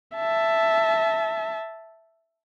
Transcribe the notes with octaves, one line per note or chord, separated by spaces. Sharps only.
E5 A5